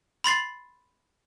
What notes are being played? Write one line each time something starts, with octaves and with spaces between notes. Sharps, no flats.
B5 C6 A6 C7